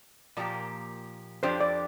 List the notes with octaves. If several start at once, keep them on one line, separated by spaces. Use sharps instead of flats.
A#2 F3 A#3 G4
F2 F3 D4 G4 C5
D5